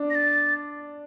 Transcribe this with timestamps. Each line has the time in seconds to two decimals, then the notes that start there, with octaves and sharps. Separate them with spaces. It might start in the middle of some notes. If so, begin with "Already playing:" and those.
Already playing: D4
0.10 A#6
0.15 A6